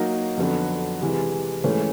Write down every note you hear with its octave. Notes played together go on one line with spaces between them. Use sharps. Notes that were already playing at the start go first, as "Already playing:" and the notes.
Already playing: F#3 A#3 D#4 F#4 A#4
F2 D3 F#3 B3
C3 E3 G#3
G#2 E3 A3 C#4